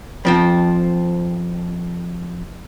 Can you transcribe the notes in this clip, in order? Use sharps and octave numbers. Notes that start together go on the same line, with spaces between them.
F2 F3 C4